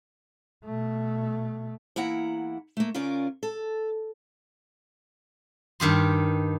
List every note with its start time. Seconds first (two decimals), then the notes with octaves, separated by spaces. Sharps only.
0.64 B2 A3
1.96 E2 A#3 E4 F#5 A#5
2.77 A3 A#3
2.94 C#3 C#4 F4 A#4 D5
3.43 A4
5.80 G2 D#3 G4 C6